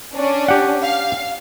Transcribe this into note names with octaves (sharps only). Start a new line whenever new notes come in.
C#4 D4
G4 F#5
F5